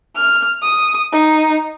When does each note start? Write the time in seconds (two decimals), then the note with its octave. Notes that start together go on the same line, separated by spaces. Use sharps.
0.16 F6
0.62 D#6
1.12 D#4